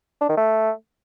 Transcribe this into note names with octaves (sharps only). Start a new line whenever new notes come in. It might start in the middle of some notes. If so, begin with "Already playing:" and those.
D4
D#3
A3